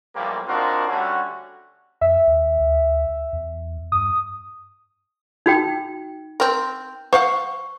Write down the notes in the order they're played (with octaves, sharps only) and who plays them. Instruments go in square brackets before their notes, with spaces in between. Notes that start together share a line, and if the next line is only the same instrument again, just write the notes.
[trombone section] B1 A#2 E3 F3 G3 A#3
C4 D4 D#4 F4 F#4 A#4
D3 G3 A3 C#4 F#4
[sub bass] F2 [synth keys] E5
[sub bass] D#2
D2
E2
[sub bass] G2 [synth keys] D#6
[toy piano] D#4 F#4 G5
[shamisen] C4 A#4
[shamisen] C5 F5 F#5 [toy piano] C#6